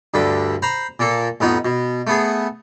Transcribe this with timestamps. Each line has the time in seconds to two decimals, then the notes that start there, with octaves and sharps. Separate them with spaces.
0.14 D2 G2 D3 B5
0.62 C5 A#5 B5
0.99 A#2 A#3 A4
1.40 A1 F2 B3 D#4 B4
1.65 B2
2.07 A3 B3 G#4